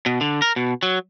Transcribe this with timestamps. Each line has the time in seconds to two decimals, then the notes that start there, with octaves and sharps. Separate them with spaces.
0.06 B2
0.21 D3
0.42 A#4
0.56 B2
0.83 F#3